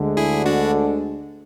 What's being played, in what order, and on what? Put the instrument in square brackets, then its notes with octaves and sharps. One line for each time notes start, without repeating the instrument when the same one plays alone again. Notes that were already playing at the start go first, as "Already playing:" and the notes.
Already playing: [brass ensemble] D2 D3 G#3
[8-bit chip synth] E4 G#4
D4 F#4